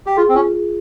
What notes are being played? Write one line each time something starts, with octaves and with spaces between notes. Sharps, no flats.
G4
F4 G#4
C4
C#4 F4
G#4